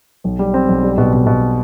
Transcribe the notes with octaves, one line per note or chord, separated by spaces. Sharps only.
B1
G3
C4
B1
G3
B2
B2
B2